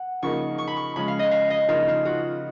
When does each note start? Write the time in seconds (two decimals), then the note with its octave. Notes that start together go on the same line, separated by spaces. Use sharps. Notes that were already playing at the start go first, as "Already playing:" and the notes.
Already playing: F#5
0.23 C#3 F3 A#3 D#4 C#6
0.58 C#6
0.67 B5
0.76 C#6
0.96 C#3 F3 G#3 C#4 B5
1.08 F5
1.19 D#5
1.31 F5
1.50 D#5
1.69 C#3 F3 A#3 D#4 F4
1.88 F4
2.05 F#4